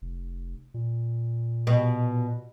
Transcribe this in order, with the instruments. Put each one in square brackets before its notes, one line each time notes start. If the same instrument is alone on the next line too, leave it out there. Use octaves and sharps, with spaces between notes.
[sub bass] F1
A#2
[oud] B2